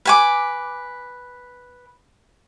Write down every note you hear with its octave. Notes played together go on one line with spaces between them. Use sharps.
B4 G#5 D6